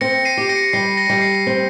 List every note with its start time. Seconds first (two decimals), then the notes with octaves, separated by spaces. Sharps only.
0.01 C4 A#6 C#7
0.25 C7 D#7
0.37 G4
0.49 A#6 C#7
0.73 G3 C7
0.97 A#6
1.09 G3
1.22 C7
1.47 C4